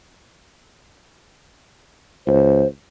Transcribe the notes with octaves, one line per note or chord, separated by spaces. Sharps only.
C#2 C5